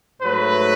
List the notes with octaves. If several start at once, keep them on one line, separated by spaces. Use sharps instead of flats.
G#2 F#3 A3 B4